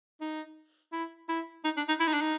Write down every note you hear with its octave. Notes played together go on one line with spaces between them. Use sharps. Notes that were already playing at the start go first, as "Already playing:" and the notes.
D#4
E4
E4
D#4
D4
D#4
E4
D#4
D4
D#4